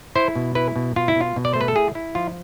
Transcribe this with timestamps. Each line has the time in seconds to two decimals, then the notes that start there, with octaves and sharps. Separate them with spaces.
0.15 E4 C5
0.36 B2
0.55 E4 B4
0.76 B2
0.96 B2 F4
1.08 E4
1.16 B2
1.21 F4
1.36 B2
1.45 D5
1.53 A3 C5
1.61 B4
1.68 A4
1.76 E4 G#4
1.95 E4
2.15 F3 F4